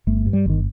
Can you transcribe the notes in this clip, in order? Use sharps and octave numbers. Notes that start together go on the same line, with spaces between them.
G1 A3
G2
G3
G1 D#3